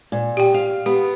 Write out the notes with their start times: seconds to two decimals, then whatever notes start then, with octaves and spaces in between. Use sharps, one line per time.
0.12 A#2
0.37 G4 G5
0.54 F5
0.86 B3 G4